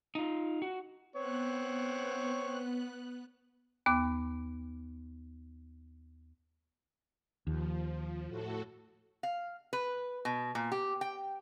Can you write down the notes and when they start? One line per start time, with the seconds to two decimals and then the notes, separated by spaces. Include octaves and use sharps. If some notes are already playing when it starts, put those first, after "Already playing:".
0.15 D#4 F4
0.62 F#4
1.16 B3 C4 C#5 F#6
3.86 D#2 B3 D6
7.47 D#2 F3
8.27 A2 F#4 A4
9.23 F5
9.73 B4
10.25 B2
10.55 A#2
10.72 G4
11.01 G5